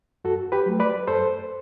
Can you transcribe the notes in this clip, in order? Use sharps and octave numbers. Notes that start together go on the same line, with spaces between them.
F#2 F#4 A4
G4 B4
F#3 A3
B4 D5
F#2 A4 C5